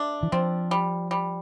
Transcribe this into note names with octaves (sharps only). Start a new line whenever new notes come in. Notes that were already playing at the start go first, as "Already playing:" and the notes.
Already playing: A3 D4
E3
F3 C4
G3
G3